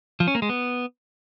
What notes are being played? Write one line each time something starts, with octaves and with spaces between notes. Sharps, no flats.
F3
C#4
A#3
G#3
B3